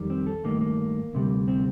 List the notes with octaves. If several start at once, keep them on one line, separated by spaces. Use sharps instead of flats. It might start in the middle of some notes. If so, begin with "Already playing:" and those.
Already playing: F2 D#3 G3
C4
A4
G2 D#3 A3 A#3
A#3
D2 C3 G3
C4